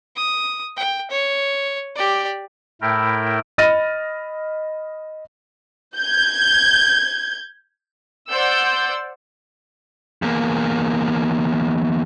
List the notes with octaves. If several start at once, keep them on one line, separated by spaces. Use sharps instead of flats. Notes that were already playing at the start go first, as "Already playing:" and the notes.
D#6
G5
C#5
G4 D5
A2 A3 E4 A#4 G5
D#5 B5 F6 A6 A#6 D#7
G6 G#6
C5 D5 F#5 E6 G6
E2 A#3